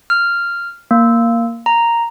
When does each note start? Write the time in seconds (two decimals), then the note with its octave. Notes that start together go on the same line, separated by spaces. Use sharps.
0.10 F6
0.91 A#3
1.66 A#5